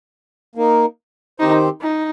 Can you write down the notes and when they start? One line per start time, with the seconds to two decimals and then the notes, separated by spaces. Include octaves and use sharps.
0.55 A#3 D#4 A#4
1.39 D#3 C4 D#4 G4 C5
1.82 D#4